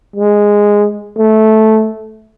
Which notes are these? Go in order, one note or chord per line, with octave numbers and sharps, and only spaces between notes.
G#3
A3